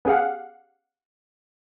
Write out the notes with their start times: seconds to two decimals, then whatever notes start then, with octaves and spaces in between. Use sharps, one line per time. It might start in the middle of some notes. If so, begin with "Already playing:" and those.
0.05 B3 C#4 G4 G#4 F5 F#5